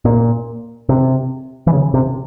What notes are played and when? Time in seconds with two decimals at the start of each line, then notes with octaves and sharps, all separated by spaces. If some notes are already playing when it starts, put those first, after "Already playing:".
0.05 A#2
0.89 C3
1.67 E3
1.73 C#3
1.94 C3